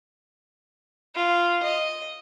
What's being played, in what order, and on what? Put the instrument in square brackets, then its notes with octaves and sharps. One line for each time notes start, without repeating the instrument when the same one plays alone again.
[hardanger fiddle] F4
D#5